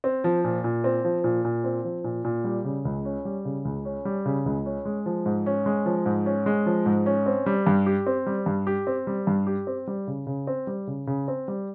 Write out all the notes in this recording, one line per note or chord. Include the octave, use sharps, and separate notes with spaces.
C4
F3
A#2
A#2
C4
F3
A#2
A#2
C4
F3
A#2
A#2
G3
C#3
C#2
C#4
G3
C#3
C#2
C#4
G3
C#3
C#2
C#4
G#3
F3
G#2
C#4
G#3
F3
G#2
C#4
G#3
F3
G#2
C#4
C4
G3
G2
G4
C4
G3
G2
G4
C4
G3
G2
G4
C4
G3
C#3
C#3
C4
G3
C#3
C#3
C4
G3